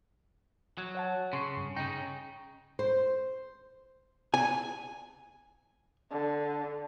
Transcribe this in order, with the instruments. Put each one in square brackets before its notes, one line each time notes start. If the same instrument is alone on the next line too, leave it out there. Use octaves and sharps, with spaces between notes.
[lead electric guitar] F#3
[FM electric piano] C#5 F#5 A5
[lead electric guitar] C#3 [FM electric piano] C6 C#6 C7
[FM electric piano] G2
[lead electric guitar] C#3 D#4 [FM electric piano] G5
[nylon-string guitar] C5
[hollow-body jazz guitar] G#5
[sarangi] D3